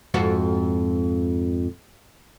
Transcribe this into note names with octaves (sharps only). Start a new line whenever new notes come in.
F2 G#2 F#4